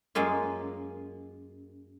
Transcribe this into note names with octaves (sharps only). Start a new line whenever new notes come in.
F#2 G#3 A#3 F4